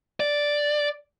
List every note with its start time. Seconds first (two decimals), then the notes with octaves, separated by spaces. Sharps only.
0.20 D5